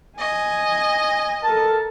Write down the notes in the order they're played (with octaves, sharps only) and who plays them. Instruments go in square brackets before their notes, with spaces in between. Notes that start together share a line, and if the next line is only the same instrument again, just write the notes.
[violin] D#5 [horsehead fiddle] G#5
[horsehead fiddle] A4 A#4 [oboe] A5